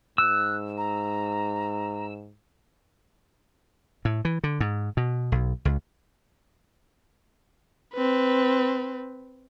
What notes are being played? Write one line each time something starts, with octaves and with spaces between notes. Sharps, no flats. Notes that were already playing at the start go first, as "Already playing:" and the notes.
G#2 E6 F#6
A#5
A2
E3
D3
G#2
B2
B1
C#2
C4 B4